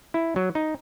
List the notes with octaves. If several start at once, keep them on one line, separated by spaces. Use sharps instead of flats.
E4
F#3
D#4